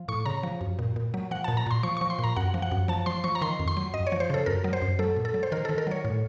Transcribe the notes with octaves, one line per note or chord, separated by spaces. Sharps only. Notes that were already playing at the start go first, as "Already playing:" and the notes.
Already playing: F3
A2 C#6
C#3 A#5
F3
F#2
A#2
A#2
F#3
F3 F#5
A#2 A5
A#5
A#2 C6
F3 C#6
C#6
F3
C6
A#2 A#5
F#2 F#5
F3
F#5
F#2
F3 A5
F3 C6
F3 C#6
A#5
D#3 C6
F2
C6
F#3
F#2 D#5
C#5
F3
C5
C#3 A4
F#2 A#4
F#3
C5
F#2
F#3 A4
A#2
A4
F#3
C5
D#3 A#4
A4
D#3
A#4
F#3 C#5
A2